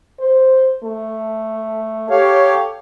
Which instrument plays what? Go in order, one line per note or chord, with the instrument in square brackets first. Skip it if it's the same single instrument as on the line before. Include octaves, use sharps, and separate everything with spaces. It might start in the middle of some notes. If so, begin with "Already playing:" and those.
[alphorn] C5
A3
[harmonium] G4 C#5 F5 [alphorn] A4